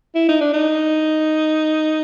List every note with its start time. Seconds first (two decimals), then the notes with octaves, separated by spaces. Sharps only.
0.15 E4
0.29 D#4
0.41 D4
0.53 D#4